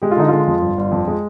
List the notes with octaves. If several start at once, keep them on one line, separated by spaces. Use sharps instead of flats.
G#3 G4
F4
D3 D#4
G#3 F4
F2
G1
G1
F2
G#3